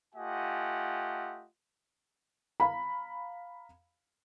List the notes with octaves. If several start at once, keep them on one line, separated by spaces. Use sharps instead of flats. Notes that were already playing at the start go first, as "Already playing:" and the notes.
A3 F4 G4 D#5 F#5 G#5
F5 A#5 B5